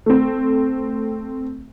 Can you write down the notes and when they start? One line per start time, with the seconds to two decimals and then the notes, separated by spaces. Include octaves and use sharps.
0.06 A3 C4